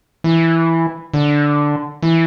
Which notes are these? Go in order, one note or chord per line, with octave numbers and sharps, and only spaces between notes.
E3
D3
E3